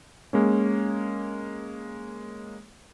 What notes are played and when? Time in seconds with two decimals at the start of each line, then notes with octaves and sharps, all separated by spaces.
0.33 G#3 A#3 C#4